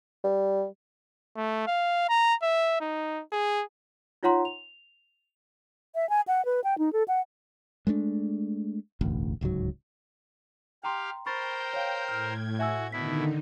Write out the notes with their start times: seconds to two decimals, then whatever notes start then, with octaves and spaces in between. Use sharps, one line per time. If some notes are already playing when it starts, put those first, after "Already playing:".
0.24 G3
1.37 A3
1.67 F5
2.09 A#5
2.42 E5
2.80 D#4
3.32 G#4
4.23 D#4 F4 C#5 F#5 A#5 C6
4.45 F7
5.95 E5
6.09 G#5
6.28 F#5
6.45 B4
6.64 G5
6.78 D#4
6.93 A4
7.08 F#5
7.87 G#3 A3 B3 D4
9.01 E1 A1 D2
9.41 D1 C#2 G#2 F#3
10.84 G4 F5 G5 A#5 C6
11.26 A#4 C5 G5 B5 C#6 G6 A6
11.73 C#5 F5
12.08 A2 F6 G#6
12.59 F#4 E5 G#5 E6
12.92 B2 D3 D#3 D#4 E4 B6